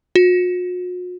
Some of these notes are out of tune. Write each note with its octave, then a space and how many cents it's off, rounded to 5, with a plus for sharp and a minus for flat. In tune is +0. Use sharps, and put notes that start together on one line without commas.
F#4 -45